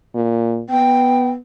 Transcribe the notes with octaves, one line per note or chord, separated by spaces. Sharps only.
A#2
B3 G5